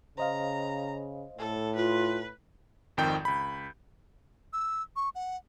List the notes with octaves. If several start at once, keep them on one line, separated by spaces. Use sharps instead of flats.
C#3 C5 D#5 F5 A#5
A2 A4
F4 B4
G#1 F2 D#3 G5 G6
C#2 B5
E6
C#6
F#5